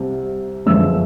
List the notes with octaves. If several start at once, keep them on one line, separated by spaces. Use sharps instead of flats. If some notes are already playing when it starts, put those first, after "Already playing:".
Already playing: C2 C3 C4
G1 F#2 D3 F3 G#3 E6